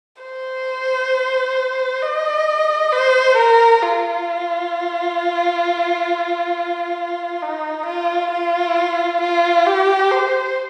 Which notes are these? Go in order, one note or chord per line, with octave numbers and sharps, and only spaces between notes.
C5
D#5
C5
A#4
F4
D#4
F4
F4
F4
G4
C5